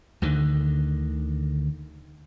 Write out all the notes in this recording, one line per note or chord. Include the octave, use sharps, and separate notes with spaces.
D2 D3 D#3